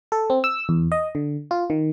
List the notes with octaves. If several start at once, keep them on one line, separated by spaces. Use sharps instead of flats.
A4
C4
E6
E2
D#5
D3
F4
D#3